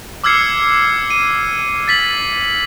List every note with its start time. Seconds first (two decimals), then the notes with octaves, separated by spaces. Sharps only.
0.24 D6 E6 F6 G#6 C7 C#7
1.10 D#7
1.88 A6 B6 F#7